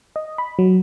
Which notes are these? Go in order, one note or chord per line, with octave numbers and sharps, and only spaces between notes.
D#5
B5
F#3